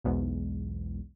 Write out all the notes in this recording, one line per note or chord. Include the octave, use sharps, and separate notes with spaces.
B1 E2 G#2